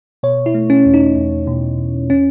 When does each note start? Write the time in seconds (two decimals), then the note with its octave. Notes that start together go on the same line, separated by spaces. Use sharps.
0.23 B2 C#5
0.46 E4
0.54 A3
0.70 C#4
0.85 E2
0.94 D#4
1.16 E2
1.47 B2
1.78 E2
2.10 C#4